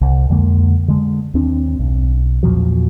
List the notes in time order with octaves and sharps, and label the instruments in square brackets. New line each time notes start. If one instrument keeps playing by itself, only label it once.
[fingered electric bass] C2
F2 D3 G#3 A#3
D3 G#3
D#2 C4 D4
B1
E2 A#2 F3 F#3